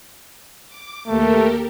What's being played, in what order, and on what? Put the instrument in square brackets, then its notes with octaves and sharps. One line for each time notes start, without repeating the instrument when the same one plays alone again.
[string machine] D6
[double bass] D#2 A#3 [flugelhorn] A3 [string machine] G4 A4 A#4